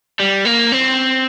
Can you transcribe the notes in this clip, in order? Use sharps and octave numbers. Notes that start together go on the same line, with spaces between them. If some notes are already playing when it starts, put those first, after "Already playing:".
G3
A#3
C4